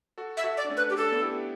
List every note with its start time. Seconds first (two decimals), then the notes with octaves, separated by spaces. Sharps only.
0.18 F#4 A4
0.37 E5
0.44 F#4 A4
0.57 D5
0.65 D4
0.70 A3 C#4
0.77 B4
0.90 G4
0.97 D4 A4
1.04 C#4
1.12 B3 D4
1.22 E4 G4